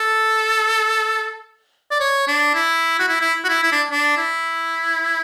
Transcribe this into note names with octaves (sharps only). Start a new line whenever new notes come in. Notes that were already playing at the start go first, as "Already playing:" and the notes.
Already playing: A4
D5
C#5
D4
E4
F#4
E4
E4
F#4
E4
E4
D4
D4
E4